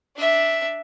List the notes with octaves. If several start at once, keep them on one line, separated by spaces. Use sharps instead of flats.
D4 E5